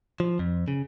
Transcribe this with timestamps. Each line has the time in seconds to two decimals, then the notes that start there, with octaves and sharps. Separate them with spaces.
0.20 F3
0.39 F2
0.68 C#3